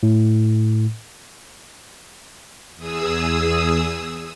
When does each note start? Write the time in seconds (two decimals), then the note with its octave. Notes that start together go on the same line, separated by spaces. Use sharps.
0.03 A2
2.76 E2 G#4 D#6 E6